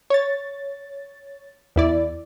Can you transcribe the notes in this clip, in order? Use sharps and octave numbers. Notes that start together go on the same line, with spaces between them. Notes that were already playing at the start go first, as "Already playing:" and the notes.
C#5 A6
E2 E4 D5